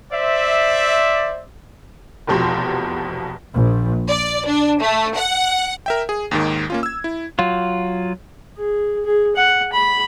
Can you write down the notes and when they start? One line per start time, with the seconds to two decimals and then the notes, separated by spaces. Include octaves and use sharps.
0.12 C5 D5 E5
2.27 F1 E2 B2 F3 G4 C6
3.54 A#1
4.09 D5
4.47 D4
4.82 A3
5.17 F#5
5.86 A#4 E5 G5
6.09 G#4
6.31 D#2 G#2 D#3
6.70 A#3 C#4 F4
6.83 E6 G#6
7.04 E4
7.39 F#3 F4
8.58 G#4
9.05 G#4
9.36 F#5
9.73 B5